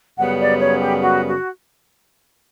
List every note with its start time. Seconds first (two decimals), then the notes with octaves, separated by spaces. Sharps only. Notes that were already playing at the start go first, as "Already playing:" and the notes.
0.18 F#2 C#3 G3 B3 F#5
0.40 D5
0.60 C#5
0.80 G4
1.01 F#4
1.28 F#4